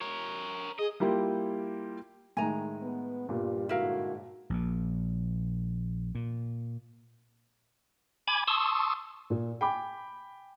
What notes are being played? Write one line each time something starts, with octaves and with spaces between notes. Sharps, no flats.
A#4 C#5
G#4 D#5
G3 A#3 E4 F4 G4
A2 D#3 G#3 G#5 A#5
B3
G2 A#2 G3 F4 G4
G#2 D3 E4 F#4 A#4 F5
A#1 A#2
A#2
G#5 B5 D6 G#6
A5 C6 C#6 D#6 E6
A#2
G5 G#5 B5 D6